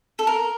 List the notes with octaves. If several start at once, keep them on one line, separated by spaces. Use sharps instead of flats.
A4
A#4